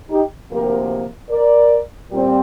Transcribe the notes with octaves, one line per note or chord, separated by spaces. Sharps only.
D#4 G4
D2 C3 F3 A#3 G4 A#4
A#4 D5
A#2 G3 C4